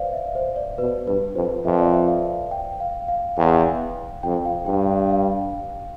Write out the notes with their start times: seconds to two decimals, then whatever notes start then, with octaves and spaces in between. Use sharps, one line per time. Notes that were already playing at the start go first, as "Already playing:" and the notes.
Already playing: B4 C5 D5 F5
0.13 E5
0.35 C5
0.56 D5
0.78 B2 B4
1.07 G2 B4
1.36 F2 C5
1.65 F2 E5
1.81 D5
1.94 E5
2.08 F5
2.51 G5
2.80 F5
3.08 F5
3.37 E2 G5
4.23 F2 G5
4.45 F5
4.66 G2 G5
5.10 F5